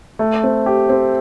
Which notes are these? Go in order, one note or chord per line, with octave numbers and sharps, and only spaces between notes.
A3
C4
G4
C4